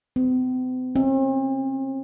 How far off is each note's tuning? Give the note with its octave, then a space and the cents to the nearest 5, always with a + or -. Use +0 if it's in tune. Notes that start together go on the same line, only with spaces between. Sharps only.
C4 -45
C4 +45